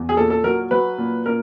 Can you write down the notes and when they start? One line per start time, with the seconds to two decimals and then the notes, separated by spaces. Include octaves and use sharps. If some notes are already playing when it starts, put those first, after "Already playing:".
Already playing: E2
0.09 G#4
0.16 A#2 A4
0.30 A4
0.44 F#3 A#4
0.71 F#3 B4
0.98 A#2
1.26 A#2 A#4